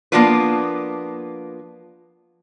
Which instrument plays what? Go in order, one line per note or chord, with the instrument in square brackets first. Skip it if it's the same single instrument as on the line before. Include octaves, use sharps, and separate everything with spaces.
[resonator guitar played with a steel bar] F3 A#3 B3 D4 F4 B4